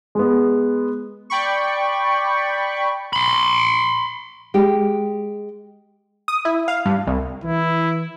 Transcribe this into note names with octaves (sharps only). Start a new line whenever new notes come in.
G#3 B3
D5 G5 B5 C#6
B5 C6
G#3 G4
D#6
E4
F5
G2
C2
E3 E4